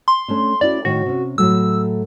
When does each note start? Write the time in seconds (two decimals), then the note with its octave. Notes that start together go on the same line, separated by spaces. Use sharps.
0.08 C6
0.28 A3 C#4 D4
0.61 C#4 E4 F#4 D5
0.85 A2 D#3 F#4 C#5
1.06 C3 C#4
1.38 A2 F#3 A3 E6